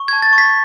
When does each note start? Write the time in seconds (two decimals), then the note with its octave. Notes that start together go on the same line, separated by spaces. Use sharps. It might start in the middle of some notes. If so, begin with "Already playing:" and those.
Already playing: C#6
0.08 A5 G#6
0.22 A6
0.33 C#6
0.38 B6